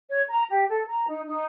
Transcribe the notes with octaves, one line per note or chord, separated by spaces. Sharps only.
C#5
A#5
G4
A4
A#5
D#4
D#4